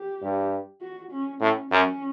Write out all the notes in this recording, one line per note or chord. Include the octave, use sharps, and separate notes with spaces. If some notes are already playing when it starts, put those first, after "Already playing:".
Already playing: G4
G2
F#4
C#4
A2 C#4
F#2 C#4